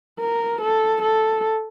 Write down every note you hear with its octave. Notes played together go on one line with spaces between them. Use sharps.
A#4
A4
A4